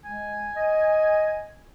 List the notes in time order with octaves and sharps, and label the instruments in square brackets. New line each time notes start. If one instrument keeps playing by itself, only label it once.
[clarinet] G#3 [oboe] G#5
[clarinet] D#5